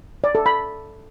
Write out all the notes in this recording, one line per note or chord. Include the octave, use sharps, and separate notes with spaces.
D5
A4
B5